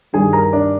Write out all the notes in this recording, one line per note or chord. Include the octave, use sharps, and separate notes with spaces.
G2 D#3 G3 G#4 G#5
A#4 A#5
D4 D5